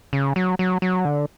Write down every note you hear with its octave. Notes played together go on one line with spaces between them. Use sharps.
C#3
F#3
F#3
F#3
D3